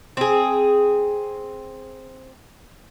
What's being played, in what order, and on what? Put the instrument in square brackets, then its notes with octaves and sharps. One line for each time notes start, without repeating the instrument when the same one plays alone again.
[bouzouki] C4 G#4